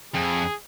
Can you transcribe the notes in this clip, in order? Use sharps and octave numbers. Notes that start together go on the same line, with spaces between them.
F2 G#4